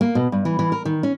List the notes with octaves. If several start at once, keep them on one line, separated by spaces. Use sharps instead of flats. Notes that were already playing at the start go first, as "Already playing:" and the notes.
A#3
B2
G2
E3
E3
A#4
D#3
C#4